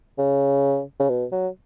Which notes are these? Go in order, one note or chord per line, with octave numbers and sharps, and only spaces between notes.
C#3
C#3
B2
F#3